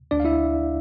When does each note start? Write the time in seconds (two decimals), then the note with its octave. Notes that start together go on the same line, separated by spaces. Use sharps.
0.11 D2 D4 D5
0.20 F5
0.25 E4 E5